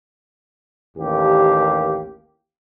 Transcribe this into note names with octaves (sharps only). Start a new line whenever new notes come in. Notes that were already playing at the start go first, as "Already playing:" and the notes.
A1 D#2 A#3 G4